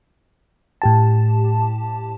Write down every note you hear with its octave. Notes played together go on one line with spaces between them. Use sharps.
A2 G4 A5